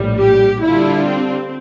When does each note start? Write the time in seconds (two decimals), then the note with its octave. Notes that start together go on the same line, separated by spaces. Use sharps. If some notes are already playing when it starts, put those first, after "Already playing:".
Already playing: A#1 A2 G3
0.18 G4
0.61 D3 G3 D4 E4 F4
1.05 C4